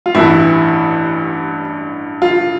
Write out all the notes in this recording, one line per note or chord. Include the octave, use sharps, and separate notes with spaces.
F4
A1 G2 E3 E4
F4